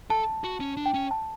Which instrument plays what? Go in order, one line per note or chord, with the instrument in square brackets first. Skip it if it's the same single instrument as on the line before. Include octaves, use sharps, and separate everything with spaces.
[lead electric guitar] A4 [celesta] A5
[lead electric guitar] F#4
C#4
D4
[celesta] G5
[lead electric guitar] C#4
[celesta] A5